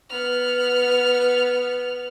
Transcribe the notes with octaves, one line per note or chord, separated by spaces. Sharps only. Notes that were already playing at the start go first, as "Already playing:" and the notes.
B3 F6